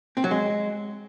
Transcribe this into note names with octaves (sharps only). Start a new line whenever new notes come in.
C4
F#3
G#3